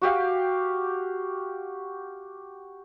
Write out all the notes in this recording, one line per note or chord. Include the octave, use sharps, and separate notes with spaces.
F#4 G4 F5